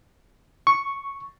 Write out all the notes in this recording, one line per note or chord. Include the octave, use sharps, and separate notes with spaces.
C#6